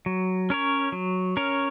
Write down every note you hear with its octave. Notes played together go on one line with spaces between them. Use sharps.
F#3
C#4 A#4 C#5
F#3
C#4 A#4 C#5